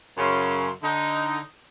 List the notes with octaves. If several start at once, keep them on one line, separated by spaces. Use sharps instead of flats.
F#2 C#3 C6
D3 D#4